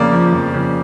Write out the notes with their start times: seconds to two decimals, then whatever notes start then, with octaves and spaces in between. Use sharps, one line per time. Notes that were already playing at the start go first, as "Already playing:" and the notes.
Already playing: F2 C#3 A#3 D5
0.12 F3
0.33 F2
0.54 C#3